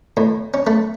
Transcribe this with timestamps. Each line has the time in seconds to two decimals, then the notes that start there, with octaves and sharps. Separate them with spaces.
0.17 A2
0.54 C#4
0.67 A3